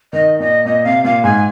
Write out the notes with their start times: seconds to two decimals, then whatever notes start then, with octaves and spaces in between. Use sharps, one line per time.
0.13 D#3 D#5
0.40 A#2 D#5
0.65 A#2 D#5
0.84 C3 F5
1.04 A#2 F5
1.24 G#2 G#5